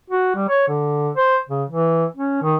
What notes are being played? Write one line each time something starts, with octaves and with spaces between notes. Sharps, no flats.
F#4
G3
C#5
D3
C5
C#3
E3
C#4
D#3